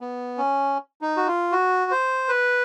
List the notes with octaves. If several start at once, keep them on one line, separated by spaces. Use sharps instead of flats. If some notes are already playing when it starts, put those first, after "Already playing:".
B3
C#4
D#4
F#4
F4
F#4
C5
B4